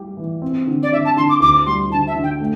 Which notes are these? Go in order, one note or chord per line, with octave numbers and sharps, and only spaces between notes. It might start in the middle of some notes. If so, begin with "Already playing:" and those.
Already playing: G3 G4
E3
C4
D3
D5
D3 E5
A5
D3 C6
D6
D2 D6
G3 C6
D3 A5
E5
D3
G5
A3